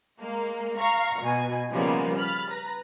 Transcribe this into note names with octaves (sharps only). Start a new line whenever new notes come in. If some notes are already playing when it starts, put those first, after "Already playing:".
G#3 A#3
F5 A#5 C#6
B2 G#5
C#3 F3 G3 G#3 A#3 B3
B5 F6 A6
B4 A#5